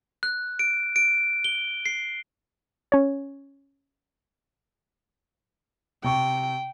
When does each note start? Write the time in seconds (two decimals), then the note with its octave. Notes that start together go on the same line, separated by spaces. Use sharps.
0.23 F#6
0.59 D7
0.96 D7
1.44 G7
1.86 C7
2.92 C#4 C#5
6.04 C3 G5 C#6